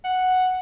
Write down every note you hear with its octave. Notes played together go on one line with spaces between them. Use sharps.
F#5